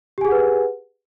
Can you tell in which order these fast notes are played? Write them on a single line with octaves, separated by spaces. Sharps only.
G4 G#5 G#4 F#5 B4